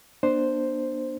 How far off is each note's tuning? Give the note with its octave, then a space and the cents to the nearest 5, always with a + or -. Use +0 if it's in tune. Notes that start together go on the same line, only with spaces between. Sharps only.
B3 -40 D4 +20 C5 +0